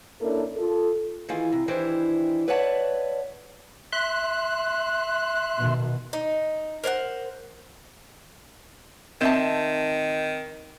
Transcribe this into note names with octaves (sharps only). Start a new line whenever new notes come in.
A#3 C#4 D4 E4 A4 A#4
F4 A4
D#3 E3 F4 G#4
C3
D#3 E3 D4 E4 G4 C5
B4 C#5 D5 E5 F#5 A5
E5 C6 F#6
B2 D#3
D#4
A#4 C5 F5 F#5
D#3 C4 E5 A5